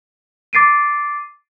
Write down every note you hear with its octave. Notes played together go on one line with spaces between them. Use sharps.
D6 A6 C7 D7 D#7